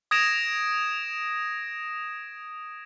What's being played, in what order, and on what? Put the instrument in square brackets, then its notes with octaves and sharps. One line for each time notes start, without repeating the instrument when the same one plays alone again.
[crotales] D#6 G#6 A#6 D7 E7 F7